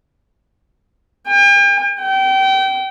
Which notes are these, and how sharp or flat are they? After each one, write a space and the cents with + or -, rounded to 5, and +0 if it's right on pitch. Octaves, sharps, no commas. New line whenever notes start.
G5 +40
G5 -30